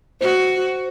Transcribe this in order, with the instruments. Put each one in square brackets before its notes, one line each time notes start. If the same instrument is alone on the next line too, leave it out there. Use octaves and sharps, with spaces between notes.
[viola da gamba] F#4 [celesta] C5